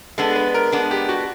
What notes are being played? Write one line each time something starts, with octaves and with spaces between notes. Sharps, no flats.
G#3 B3 D4 A4
B4
A#4
G#3 B3 D4
G4
F#4